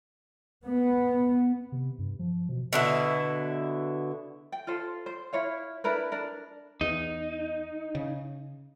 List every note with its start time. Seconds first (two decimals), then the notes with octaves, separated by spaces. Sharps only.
0.66 B3
1.72 C3
1.99 G2
2.19 F3
2.49 B2
2.73 B2 D3 E4
4.52 G5
4.67 F4 A4 C5
5.06 C5
5.33 E4 C#5 F5
5.84 D4 E4 A#4 B4
6.12 D4 A#4
6.81 E2 D#4
7.95 C#3